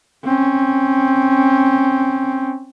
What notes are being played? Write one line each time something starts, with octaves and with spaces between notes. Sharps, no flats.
C4 C#4